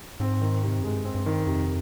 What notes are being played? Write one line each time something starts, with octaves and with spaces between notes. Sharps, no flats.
G#2 C4
D#3
C3
F#2
G2 G#3
C4
G2
D#3
F2 C3